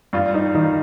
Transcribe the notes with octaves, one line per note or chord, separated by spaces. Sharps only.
G2 F4
D#4
D#3 D#4